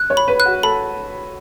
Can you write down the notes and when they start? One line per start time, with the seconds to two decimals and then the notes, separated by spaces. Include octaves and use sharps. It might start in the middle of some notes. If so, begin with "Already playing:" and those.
Already playing: F#6
0.10 C#5
0.17 B5
0.28 B4
0.40 F#6
0.45 F#4
0.63 A4 B5